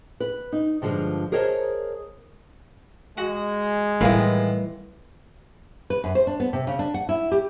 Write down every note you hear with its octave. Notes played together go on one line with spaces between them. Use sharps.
B4
D#4
G2 D3 F3 G#3
G#4 A#4 C5 C#5 D#5 A5
G#3 F#4 F#5
A2 D#3 E3 G3 B4 F5
B4
F#2
C5
D4
B3
C3
C#3
D4
F#5
E4
G4